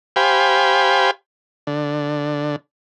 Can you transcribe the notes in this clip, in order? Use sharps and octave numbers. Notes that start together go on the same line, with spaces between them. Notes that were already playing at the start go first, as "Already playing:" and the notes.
G4 C5 F5 G5 G#5 B5
D3